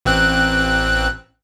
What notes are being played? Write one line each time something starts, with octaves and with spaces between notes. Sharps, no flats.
A1 C4 F#6